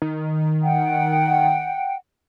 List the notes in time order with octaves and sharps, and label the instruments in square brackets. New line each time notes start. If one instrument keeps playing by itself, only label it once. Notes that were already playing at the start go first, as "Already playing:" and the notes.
[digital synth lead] D#3
[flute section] F#5 G5